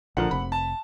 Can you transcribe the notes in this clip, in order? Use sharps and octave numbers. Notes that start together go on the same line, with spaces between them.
A#1 D3 F3 A#4 F#5
F1 C3 B5
A5